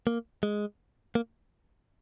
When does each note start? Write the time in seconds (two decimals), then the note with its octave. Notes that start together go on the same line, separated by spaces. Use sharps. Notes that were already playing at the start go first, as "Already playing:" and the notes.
0.07 A#3
0.43 G#3
1.15 A#3